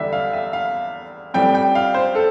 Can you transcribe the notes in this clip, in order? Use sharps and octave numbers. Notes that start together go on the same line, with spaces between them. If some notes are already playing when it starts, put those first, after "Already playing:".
Already playing: E2 D3 G3 D4 E5
F5
E5
F5
A#1 A2 G3 C4 G5
G5
F5
C5
A4